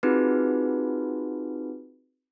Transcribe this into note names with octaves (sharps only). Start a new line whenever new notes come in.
C4 D#4 F4 F#4 G#4 B4